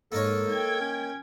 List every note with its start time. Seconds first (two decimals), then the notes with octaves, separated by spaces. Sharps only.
0.12 G#2 A#3 D#4 A4 C#5
0.50 G5 G#6
0.81 C#4